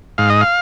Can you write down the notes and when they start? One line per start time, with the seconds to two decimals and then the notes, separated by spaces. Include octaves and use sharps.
0.18 G#2 F5
0.30 D#5
0.41 F5